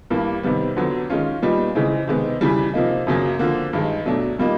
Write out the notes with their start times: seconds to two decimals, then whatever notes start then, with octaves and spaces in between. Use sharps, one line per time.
0.10 G2 E3 G3 A#3
0.43 C3 D#3 G3 B3
0.76 F2 D3 F#3 B3
1.10 D#3 G#3 C#4 F4
1.42 A#2 G3 B3 D#4
1.75 C#3 E3 G#3 C4
2.08 C3 D#3 G#3 B3
2.41 F2 C#3 E3 G3
2.74 C3 F3 A#3 D#4
3.07 F#2 C#3 F#3 A#3
3.39 F2 D3 F3 A#3
3.73 G2 D#3 G#3
4.06 B2 F#3 A3 D4
4.39 A#2 G3 A#3 D#4